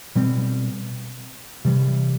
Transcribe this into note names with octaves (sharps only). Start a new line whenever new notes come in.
B2 G3 C4
C3 E3 G3